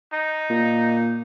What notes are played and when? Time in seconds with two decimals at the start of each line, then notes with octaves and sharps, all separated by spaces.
0.13 D#4
0.50 A#2